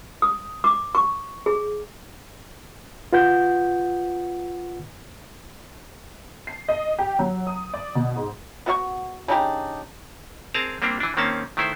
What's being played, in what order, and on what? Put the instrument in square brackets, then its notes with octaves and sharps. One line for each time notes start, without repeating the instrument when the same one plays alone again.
[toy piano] D#6
D6
C#6
G#4
[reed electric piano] F4 B4 F#5 G6
[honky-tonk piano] C7
D#5
G4
F#3
D#6
D5
B2
G#2
[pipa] B3 F#4 F5 C#6
C#3 D4 D#4 G4
[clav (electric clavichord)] C4 G#4 A#4 A5 A#5
G3 A#3 C4 D4 G4
E3 D4
D#3 A#3 C4 C#4 A5
D#3 A3 E4 C5